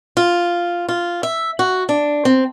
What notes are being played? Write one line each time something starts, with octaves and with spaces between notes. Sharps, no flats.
F4
F4
E5
F#4
D4
C4